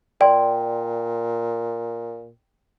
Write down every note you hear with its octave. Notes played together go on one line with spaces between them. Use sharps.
A#2 D5 G5 C6